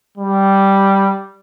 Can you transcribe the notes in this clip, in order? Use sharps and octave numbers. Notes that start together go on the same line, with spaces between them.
G3